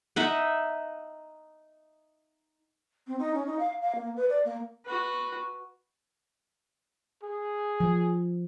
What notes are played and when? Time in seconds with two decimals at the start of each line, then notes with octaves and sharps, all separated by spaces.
0.16 D#4 E5 F#5
3.07 C4
3.19 D#4
3.34 C#4
3.46 D#4
3.59 F5
3.82 F5
3.95 A#3
4.16 B4
4.29 D5
4.45 A#3
4.85 F#4 B4
7.23 G#4
7.80 F3